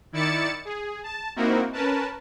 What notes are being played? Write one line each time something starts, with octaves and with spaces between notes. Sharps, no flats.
D#3 E4 D5 A6 C#7 E7
G#4
A5
A#3 C4 D#4 E4 F#4 A#4
C#4 A#4 B4 A5